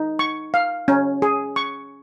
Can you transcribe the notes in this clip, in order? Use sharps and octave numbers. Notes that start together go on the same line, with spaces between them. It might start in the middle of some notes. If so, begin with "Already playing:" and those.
Already playing: D#4
C#6
F5
C#4
G#4
C#6